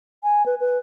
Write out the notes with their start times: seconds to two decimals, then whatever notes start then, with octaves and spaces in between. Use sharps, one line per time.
0.23 G#5
0.46 B4
0.60 B4